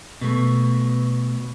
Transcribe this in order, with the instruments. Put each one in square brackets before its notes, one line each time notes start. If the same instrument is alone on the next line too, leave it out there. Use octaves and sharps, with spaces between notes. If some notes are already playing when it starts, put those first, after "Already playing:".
[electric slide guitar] B2 A3